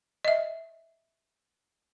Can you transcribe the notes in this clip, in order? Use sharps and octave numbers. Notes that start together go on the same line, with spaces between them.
D#5 E5